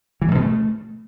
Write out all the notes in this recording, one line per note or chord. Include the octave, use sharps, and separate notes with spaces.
E3
G#2
B2
A3